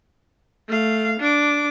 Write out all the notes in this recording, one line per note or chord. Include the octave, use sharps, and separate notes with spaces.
A3 F5
D4 D6